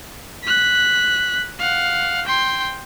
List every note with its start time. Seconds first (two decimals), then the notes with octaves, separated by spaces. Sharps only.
0.44 F#6 B6
1.59 F5 F#5
2.26 G5 C6